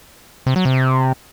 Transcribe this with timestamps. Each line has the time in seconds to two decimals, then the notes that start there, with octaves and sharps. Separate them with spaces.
0.46 C3
0.56 F#3
0.65 C3